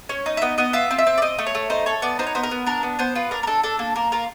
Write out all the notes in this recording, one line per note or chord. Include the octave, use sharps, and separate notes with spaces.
C#4 C#5
D#4
E5
B3 D#5
B3 D#5
F4 E5
C4
E5
C4
D5
C4 D#5
A3
C#5
A3
D#4 C5
A4 C#5
B3 D5
D#4 C5
C#5
B3 C5
A#4
B3
D4 A#4
B3
B3 C5
F4 B4
D4 A#4
A#4
D4 A4
D4 A4
A#3 A4
A#3 A#4
F4 A#4